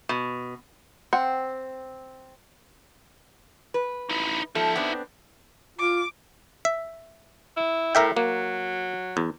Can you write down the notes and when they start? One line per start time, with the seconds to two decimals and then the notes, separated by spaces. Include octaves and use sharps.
0.09 B2
1.13 C4 F#5
3.74 B4
4.10 D#4 E4
4.55 F3 D#4 A4 E5
4.76 B3 C4 D4
5.79 F4 D6
6.65 E5
7.56 E4
7.95 A2 A#4 E5 G5
8.17 F#3 A#3
9.17 E2